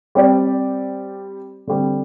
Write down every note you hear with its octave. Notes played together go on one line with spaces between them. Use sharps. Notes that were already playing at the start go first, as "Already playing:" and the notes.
G3 C4 G4 D5
D3 G3 C4